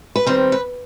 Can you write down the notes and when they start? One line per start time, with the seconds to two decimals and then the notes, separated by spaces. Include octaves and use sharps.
0.16 B4
0.26 D#3 G3 C4 C5
0.52 B4